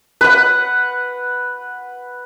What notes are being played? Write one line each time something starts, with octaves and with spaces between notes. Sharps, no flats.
B4 F#5